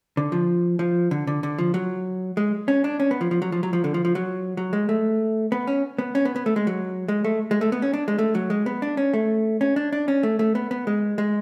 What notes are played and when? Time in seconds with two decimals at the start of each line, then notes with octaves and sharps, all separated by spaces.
0.17 D3
0.32 F3
0.79 F3
1.11 D3
1.27 D3
1.43 D3
1.58 F3
1.74 F#3
2.37 G#3
2.68 C#4
2.84 D4
3.00 C#4
3.11 B3
3.21 F3
3.31 F3
3.42 F#3
3.52 F3
3.63 F#3
3.73 F3
3.84 D3
3.94 F3
4.05 F3
4.15 F#3
4.57 F#3
4.73 G#3
4.89 A3
5.52 B3
5.67 C#4
5.98 B3
6.15 C#4
6.25 B3
6.36 B3
6.46 A3
6.56 G#3
6.67 F#3
7.08 G#3
7.25 A3
7.51 G#3
7.61 A3
7.72 B3
7.82 C#4
7.93 D4
8.08 G#3
8.18 A3
8.35 F#3
8.50 G#3
8.66 B3
8.82 D4
8.97 C#4
9.13 A3
9.61 C#4
9.76 D4
9.93 D4
10.08 C#4
10.23 A3
10.39 A3
10.55 B3
10.71 B3
10.87 G#3
11.18 G#3